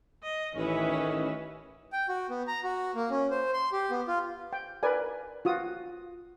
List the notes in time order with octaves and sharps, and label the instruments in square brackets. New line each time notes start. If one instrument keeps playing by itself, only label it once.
[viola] D#5
[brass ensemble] A1 D#3 D#5 [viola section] E3 C#5 E5 [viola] C#4 B4
[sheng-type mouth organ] G5
F#4
B3
A#5
F#4
A#3
C#4
C5
C6
G4
B3
F4
[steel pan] G5
A#4 B4 D5 G#5
F4 F#4 D#6